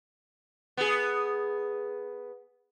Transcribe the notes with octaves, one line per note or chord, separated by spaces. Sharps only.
B3 G#4